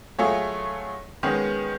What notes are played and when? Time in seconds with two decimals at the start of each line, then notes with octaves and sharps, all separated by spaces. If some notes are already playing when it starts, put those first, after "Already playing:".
0.19 F#3 A3 F4 G#4 C#5
1.23 D#3 G#3 B3 C#4